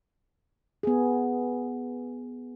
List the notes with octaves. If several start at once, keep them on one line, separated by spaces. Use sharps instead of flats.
B3 G#4